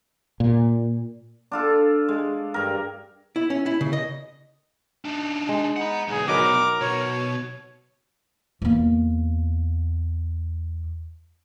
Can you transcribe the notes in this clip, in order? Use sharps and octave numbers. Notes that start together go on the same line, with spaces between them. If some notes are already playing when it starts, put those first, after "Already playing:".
A#2
D4 F4 A4
G#3
G2 A#4
E4
C#4
E4
C#3
D#5
D4 D#4
G#3
D#4 F#5 B5
B1 E2 G#4
F#3 D#4 A#4 B4 D6
B2 C#5
E2 A#3